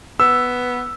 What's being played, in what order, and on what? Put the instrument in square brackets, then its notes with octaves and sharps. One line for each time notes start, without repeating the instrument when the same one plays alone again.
[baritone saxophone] B3 [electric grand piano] E6